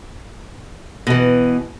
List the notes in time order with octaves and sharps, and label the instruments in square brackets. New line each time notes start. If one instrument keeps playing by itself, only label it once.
[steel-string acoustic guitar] B2 E3